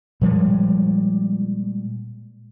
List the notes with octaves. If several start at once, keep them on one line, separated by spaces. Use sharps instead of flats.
A#2 F3 G3 G#3